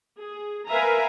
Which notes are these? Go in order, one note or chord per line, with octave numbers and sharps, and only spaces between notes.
G#4
A#4 B4 E5 F5 G#5 A#5